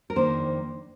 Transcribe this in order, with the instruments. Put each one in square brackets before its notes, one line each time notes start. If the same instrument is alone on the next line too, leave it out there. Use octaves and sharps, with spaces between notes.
[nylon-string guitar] A#4
F2 D#3 A#3 D4 C5